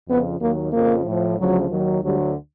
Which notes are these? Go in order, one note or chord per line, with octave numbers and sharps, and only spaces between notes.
F2 C#3 F3 B3
D#2 D#3 F#3 A#3
F2 C#3 F3 A#3
A2 F3
D2 C#3 F3 F#3
D#2 D#3 F#3
D2 D3 F#3 G3